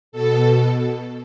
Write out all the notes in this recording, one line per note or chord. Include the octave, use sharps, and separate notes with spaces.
B2 A4